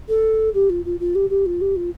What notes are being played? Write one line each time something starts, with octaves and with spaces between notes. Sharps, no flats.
A4
G4
F4
F4
F4
G4
G4
F4
G4
F4